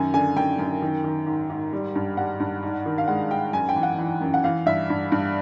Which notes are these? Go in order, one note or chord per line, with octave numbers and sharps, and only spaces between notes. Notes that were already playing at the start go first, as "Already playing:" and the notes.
Already playing: F#2 D#3 G#5
D3 G#5
F#2 G5
F#2
D#3
D#3
G#2
G#2
G3
G2
G3 F#5
G2
G#2
D#3
F5
G#3 F#5
G#2 G5
F#2 G#5
G5
E3
F#5
E3
F#2
F#5
E3 F5
G2 E5
G2
G2